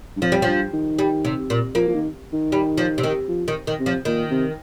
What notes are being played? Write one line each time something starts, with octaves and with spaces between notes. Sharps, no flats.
G2
F2 F3
G3
G2 F3
D#3
G3
C3
A#2
F3 A#3
F3
D#3
D#3
G3
F3
C3
D#3
F3
D#3
D#3
C3
F3
A#2 D#3
C3